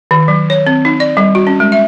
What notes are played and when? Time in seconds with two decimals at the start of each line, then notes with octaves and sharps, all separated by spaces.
0.11 D#3
0.28 F#3
0.50 C#5
0.67 C4
0.85 D#4
1.00 D5
1.17 G3
1.35 F#4
1.47 C#4
1.60 G#3
1.72 E5